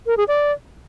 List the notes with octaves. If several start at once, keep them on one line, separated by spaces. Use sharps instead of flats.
A#4
G#4
D5